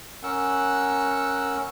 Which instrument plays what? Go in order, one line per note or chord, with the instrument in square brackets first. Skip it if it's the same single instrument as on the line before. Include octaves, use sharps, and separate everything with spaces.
[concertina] C#4 A#4 F#5 E6 F#6